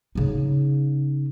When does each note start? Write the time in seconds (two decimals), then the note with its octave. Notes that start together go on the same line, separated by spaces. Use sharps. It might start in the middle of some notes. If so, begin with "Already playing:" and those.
0.15 C#3 D#4